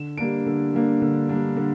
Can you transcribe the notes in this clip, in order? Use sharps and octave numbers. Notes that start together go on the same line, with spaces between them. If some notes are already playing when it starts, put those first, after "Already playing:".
Already playing: D3 E7
G3 A#3 D4 D7
D3
G3 A#3 D4
D3
G3 A#3 D4
D3